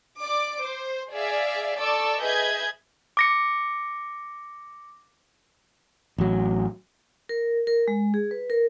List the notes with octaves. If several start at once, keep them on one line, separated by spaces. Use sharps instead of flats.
D5 D6
C5
G#4 D5 E5 F5
A4 D5 A5 C#6 D6 E6
G#4 B4 D#5 E5 G6 G#6
D6 A#6 C#7
A1 F#3
A#4
A#4
G#3
G#4
B4
A#4